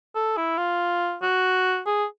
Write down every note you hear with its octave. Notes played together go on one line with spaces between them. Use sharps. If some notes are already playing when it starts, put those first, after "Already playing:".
A4
E4
F4
F#4
G#4